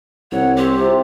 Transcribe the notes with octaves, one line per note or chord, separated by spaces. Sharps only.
C2 C#5 F#5
C4 G4
C3 F4